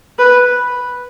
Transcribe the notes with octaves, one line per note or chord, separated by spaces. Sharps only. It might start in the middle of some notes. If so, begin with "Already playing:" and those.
B4